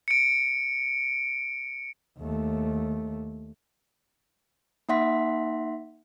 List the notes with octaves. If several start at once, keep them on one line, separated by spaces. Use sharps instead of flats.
C#7 D7
D#2 A3
A#3 D#4 E5 F#5 C6 B6